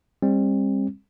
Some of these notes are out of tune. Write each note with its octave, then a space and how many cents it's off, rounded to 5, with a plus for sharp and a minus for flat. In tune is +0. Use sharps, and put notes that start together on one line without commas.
G3 +40 C4 +35